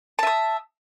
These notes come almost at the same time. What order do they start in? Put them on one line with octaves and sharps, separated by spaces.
A5 E5 D#6